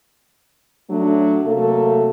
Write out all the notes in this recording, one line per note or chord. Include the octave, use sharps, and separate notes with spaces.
F#3 A3 D4
C3 F#3 A3 A#3 A4